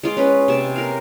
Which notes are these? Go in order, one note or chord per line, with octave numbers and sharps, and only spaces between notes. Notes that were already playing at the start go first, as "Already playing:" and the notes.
G#3 F4 D6
C#4 B4
C3 A5
A#4 F5